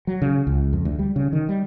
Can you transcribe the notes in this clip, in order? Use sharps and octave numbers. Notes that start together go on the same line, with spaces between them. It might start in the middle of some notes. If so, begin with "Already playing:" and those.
F#3
C#3
C#2
F2
D2
G3
C#3
D#3
G3